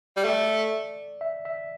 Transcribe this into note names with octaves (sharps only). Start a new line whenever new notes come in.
G3
A3 D5
E5
E5